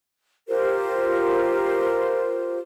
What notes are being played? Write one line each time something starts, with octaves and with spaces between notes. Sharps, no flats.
F4 G4 A#4 C5